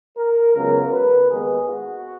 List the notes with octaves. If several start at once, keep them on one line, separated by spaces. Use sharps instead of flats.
A#4
C#2 C#3 F#3 B3 A#4
B4
D#2 D#3 G#3 B3 G#4
F#4